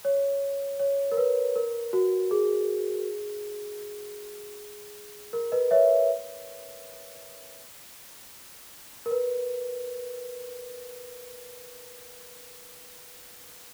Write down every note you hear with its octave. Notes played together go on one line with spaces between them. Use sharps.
C#5
C#5
A#4
B4
A#4
F#4
G#4
A#4
B4 D#5
C#5 E5
A#4
B4